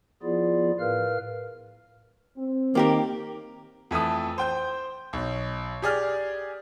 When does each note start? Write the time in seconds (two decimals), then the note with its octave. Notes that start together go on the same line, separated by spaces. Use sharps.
0.23 F3 B3 E4 F4 G#4 D5
0.80 A2 A#4 B4 F5 F6
2.37 C4
2.75 D#3 A#3 G4 A#4
3.91 F2 E3 A3 A5 D#6
4.38 C5 G5 G6
5.13 B1
5.82 G4 G#4 D5 F6